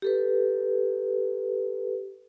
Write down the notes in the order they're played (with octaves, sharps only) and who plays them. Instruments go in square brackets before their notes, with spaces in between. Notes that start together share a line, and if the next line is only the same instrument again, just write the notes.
[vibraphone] G4 A4 B4